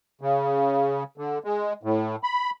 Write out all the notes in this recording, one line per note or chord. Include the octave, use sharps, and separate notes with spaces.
C#3
D3
G#3
A2
B5